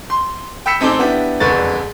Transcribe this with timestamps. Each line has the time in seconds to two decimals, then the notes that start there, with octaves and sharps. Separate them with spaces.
0.10 C6
0.66 G5 B5 E6 B6 C#7 E7
0.80 A1 C4 D#4 A4 D6 G7
0.99 B3 D4 E4 G4
1.40 E1 F2 D3 B4 C#6 A6